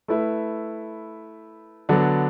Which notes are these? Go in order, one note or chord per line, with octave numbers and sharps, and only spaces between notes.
A3 E4 B4
D3 F#3 B3 D4